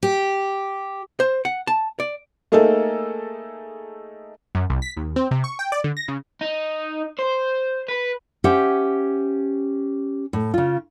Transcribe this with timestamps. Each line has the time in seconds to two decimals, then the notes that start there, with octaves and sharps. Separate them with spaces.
0.03 G4
1.20 C5
1.45 F#5
1.67 A5
2.00 D5
2.52 A3 A#3 D#4 G#4 A4
4.55 F#2
4.70 C2
4.82 B6
4.97 D#2
5.16 C4
5.31 C3
5.44 C#6
5.59 G5
5.72 D5
5.84 D3
5.97 A#6
6.08 C#3
6.41 D#4
7.19 C5
7.89 B4
8.44 C#4 G4 C5 E5 F#5
10.33 A2
10.54 C#3 F4